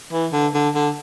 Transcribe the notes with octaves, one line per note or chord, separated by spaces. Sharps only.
E3
D3
D3
D3